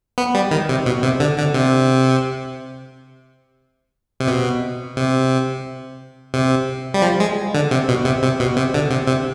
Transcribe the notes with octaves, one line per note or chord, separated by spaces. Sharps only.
B3
G3
D#3
C3
B2
C3
D3
D3
C3
C3
B2
C3
C3
G3
F3
G#3
D3
C3
B2
C3
C3
B2
C3
D3
C3
C3